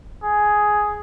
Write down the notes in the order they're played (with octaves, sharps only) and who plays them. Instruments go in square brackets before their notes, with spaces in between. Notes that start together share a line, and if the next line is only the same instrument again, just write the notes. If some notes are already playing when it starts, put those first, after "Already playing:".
[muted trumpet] G#4